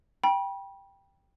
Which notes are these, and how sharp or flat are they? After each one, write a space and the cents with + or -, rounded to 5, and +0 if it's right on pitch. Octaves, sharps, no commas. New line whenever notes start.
G5 +5 B5 -35